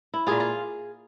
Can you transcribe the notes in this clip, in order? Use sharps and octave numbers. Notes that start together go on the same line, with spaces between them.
E4
A#2 F4 G#4
F4